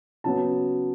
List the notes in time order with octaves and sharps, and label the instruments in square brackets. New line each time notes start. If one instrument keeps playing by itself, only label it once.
[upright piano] C#3 F#3 B3 A5